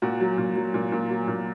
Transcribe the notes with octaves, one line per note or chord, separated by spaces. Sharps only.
A#2 F#4
F#3
A#2
F#3
A#2
A#2
F#3
A#2